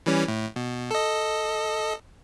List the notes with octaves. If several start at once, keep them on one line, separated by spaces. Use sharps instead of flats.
E3 G3 C#4
A2
B2
A4 D#5